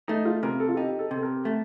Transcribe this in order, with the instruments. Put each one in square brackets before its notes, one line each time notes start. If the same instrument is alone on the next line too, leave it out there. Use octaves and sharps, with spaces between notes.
[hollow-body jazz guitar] A3 [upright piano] D#4
[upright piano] F4
[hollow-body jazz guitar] C3 [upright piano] A#4
[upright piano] A4
F4
[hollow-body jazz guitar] D#4 [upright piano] G4
[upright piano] A4
[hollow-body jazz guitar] C3
[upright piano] A4
A#4
[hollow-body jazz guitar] A3